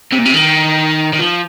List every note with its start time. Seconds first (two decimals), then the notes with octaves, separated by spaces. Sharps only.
0.12 C3
0.18 A#2
0.25 C3
0.34 D#3
1.13 D#3
1.19 F3